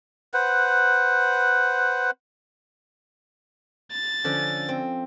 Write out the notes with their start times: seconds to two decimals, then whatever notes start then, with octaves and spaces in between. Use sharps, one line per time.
0.34 B4 C5 F#5
3.92 A6
4.24 D3 F3 C#4
4.69 C4